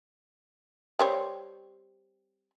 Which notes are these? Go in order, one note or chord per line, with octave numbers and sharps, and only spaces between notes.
G3 C4 C#5